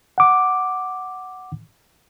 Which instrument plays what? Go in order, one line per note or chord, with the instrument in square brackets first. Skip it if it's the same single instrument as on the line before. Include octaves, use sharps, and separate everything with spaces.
[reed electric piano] F#5 D6